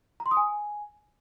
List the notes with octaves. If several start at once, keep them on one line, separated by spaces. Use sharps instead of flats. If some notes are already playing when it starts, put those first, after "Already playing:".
A#5
C6
D#6
G#5